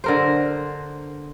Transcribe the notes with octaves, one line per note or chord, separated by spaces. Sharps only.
D3 A#4 C5